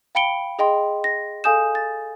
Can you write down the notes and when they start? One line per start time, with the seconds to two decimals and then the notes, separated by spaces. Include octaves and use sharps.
0.15 F5 G5 B5 C#7 D7 G7
0.59 G#4 D#5 G5 C6
1.04 A#6
1.44 A4 F5 G#5 D#6 G6 E7
1.75 A6